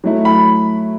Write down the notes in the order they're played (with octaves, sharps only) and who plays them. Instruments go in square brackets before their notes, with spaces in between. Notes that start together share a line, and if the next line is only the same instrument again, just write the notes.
[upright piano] F#3 A3 E4
[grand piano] B5